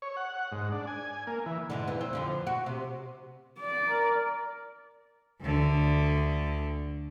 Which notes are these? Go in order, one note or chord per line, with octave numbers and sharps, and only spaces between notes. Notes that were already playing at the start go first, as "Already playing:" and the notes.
C#5
F#5
G#2
D4
G#5
A#3
E3
E2 G#2 D3
F2 E3
C4
F2 D3 F3
F#4
C3
D5
A#4
D2 D3